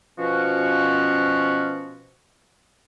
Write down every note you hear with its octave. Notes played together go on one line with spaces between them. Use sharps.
B2 F3 C#4 F#4